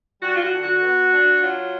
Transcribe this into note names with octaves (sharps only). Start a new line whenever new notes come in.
G3 F#4
F4
F#4
D3
F#4
B3
D4
F#3 F4